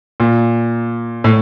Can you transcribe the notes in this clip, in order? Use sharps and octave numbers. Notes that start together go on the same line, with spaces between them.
A#2
A2